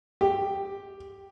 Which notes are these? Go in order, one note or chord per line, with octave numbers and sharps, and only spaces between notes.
G4